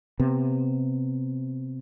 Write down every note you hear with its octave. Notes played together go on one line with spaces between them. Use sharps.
C3 B3